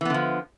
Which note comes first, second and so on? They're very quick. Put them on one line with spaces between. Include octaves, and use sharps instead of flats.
E3 B3 D3 F3